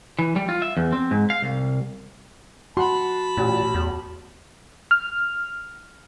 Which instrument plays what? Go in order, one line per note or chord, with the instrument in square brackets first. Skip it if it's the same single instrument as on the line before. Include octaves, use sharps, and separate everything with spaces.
[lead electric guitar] E3
G3
F4
E5
E2
C4
G#2
F5
C2
[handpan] F#4 [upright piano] F#5 C6 [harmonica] A5 B5
[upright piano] A1 [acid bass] A#2
[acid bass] E2
[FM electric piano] F6